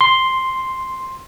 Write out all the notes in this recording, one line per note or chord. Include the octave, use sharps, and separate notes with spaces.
C6